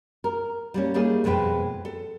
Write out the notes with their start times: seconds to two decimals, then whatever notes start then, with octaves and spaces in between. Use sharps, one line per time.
0.24 A#4
0.74 G3 A#3 C#4
0.94 G3 A3 A#3 D#4 G#4
1.24 F2 B2 G#3 B4 G5
1.85 A4